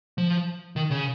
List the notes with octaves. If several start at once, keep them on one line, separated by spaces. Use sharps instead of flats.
F3
D#3
C#3